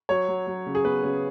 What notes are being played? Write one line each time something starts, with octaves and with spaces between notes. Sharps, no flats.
F#3 C#5
F#3
F#3
C#3
G#4
B3 B4
C#3